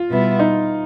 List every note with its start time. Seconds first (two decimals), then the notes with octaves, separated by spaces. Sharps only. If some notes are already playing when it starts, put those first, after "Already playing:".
Already playing: F4
0.08 B2 G3 B3 E4
0.39 D#4